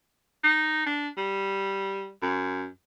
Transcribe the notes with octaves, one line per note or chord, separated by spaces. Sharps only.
D#4
D4
G3
F#2